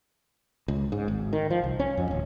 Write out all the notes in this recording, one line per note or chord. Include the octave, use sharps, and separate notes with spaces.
C#2
G#2
G#1
D#3
F3
C2
C#4
F2
D1